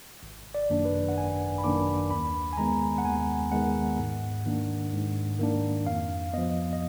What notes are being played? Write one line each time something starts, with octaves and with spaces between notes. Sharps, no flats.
G#1
D5
F#2 D#3 A#3 D4
B4
F#5
G#1 G#5
B5
F#2 D#3 A#3 D4 D6
D#2 B5
G#5
D#3 G#3 B3 A#5
F#5
D#2 G#5
D#3 G#3 B3 F#5
G#2
D#3 A#3 D4
G#2
D#3 A#3 D4
F2 F5
F3 B3 D#5
D#5